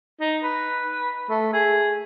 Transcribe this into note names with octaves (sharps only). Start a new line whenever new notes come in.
D#4
B4
A3
G#4